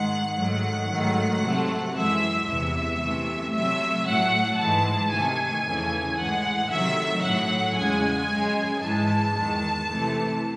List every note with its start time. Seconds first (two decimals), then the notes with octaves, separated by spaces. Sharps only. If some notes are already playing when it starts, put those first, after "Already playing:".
Already playing: G#2 D#3 G#3 F#5
0.35 G#2 D#3 F#3 A3 F#5
0.89 G#2 D#3 F#3 A3
1.42 C3 F#3 A3
1.94 F#2 E3 G#3 E5
2.47 E2 C3 E3 E5
3.00 C3 E3 A3
3.53 C3 F#3 A3 E5
4.05 A2 F#3 A3 F#5
4.58 G#2 E3 G#3 A5
5.11 C3 D#3 A3 G#5
5.64 E2 C#3 E3 A3
6.17 A2 E3 G#3 F#5
6.69 C3 D#3 F#3 A3 E5
7.22 A2 F#3 A3 F#5
7.76 E2 C#3 G#3 G#5
8.29 F#2 C#3 G#3
8.81 G#2 E3 G#3 A5
9.34 E2 D#3 G#3
9.88 C3 E3 A3